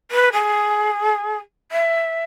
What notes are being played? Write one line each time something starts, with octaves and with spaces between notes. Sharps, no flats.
B4
G#4
E5